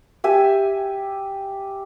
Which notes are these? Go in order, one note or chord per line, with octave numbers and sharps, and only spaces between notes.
G4 E5 G#5